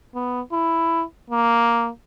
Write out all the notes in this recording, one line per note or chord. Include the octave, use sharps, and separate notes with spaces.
B3
E4
A#3